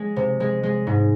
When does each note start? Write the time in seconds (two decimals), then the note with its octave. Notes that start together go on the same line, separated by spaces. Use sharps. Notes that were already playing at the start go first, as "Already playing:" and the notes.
Already playing: G#3
0.16 C3
0.40 G#3
0.63 G#3
0.87 G#2